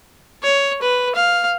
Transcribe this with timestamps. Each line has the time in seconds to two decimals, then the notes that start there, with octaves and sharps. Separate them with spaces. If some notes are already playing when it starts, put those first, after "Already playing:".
0.43 C#5
0.82 B4
1.15 F5